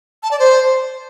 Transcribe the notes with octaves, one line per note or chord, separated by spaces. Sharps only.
A5
D5
C5